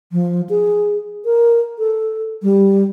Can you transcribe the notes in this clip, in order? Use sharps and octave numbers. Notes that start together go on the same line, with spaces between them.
F3
G#4
A#4
A4
G3